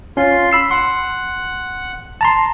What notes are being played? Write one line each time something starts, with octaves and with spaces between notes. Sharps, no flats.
C#4 F4 C6
B5 E6 C7
F#5 C6
A5 A#5 C6